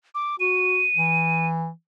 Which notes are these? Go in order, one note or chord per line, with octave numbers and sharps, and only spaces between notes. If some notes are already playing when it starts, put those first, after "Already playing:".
D6
F#4 D#7
E3